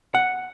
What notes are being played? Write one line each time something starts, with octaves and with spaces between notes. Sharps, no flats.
F#5